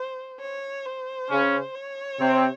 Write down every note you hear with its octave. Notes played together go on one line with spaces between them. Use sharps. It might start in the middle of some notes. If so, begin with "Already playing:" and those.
Already playing: C5
C#5
C5
C#3 C#4
C#5
C3 C4